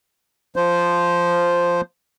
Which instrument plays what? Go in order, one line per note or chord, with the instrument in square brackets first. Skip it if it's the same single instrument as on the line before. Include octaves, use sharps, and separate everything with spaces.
[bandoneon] F3 C5